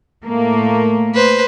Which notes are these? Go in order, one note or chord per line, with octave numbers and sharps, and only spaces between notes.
A2 A3 A#3
B4 C5